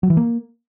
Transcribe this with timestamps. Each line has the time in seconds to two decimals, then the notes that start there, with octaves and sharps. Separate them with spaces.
0.03 F#3
0.10 E3
0.17 A#3